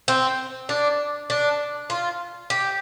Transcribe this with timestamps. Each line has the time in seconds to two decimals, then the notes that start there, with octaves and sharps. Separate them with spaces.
0.08 C4
0.69 D4
1.30 D4
1.90 F4
2.50 G4